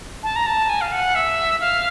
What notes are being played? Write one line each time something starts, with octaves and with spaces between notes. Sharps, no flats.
A5
A#5
A5
G#5
F5
F#5
E5
F5